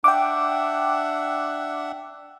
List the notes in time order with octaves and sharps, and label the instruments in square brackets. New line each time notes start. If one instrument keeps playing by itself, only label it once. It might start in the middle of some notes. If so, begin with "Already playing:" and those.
[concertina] D4 E5 F#5 [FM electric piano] G5 D6